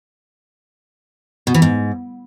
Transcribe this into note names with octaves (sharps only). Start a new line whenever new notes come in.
B2
E3
G#2